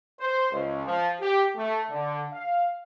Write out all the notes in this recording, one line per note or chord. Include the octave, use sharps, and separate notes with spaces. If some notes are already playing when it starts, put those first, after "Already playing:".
C5
C#2
F3
G4
A3
D3
F5